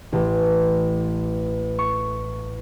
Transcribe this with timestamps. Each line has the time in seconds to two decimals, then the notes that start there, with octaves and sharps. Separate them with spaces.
0.12 A1
1.79 C#6